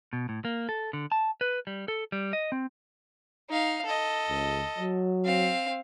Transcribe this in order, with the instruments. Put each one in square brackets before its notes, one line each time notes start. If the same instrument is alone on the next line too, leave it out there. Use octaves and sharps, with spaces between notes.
[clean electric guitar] B2
A2
A#3
A4
D3
A5
B4
G3
A4
G3
D#5
C4
[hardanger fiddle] D#4 F5
A4 D#5
[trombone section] C#2
F#3
[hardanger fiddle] C4 F5